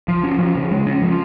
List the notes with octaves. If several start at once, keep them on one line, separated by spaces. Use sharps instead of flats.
F3
C#4
F3
C#3
G#3
C#4
F3